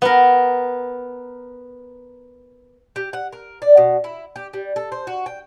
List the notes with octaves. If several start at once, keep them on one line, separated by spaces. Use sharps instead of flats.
B3 A#4
G4
F#5
A#4
D5
B2
E4
G4
G3
A4
C5
F#4
G5